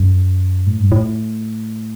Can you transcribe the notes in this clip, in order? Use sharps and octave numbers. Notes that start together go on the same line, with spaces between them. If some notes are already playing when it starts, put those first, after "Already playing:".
Already playing: F#2
A2
G2
A2